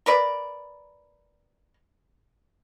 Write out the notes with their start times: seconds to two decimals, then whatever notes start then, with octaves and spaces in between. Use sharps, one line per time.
0.06 A#4 B4 D5